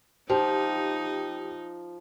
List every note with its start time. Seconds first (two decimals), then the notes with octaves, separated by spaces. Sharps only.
0.30 F3 D#4 G4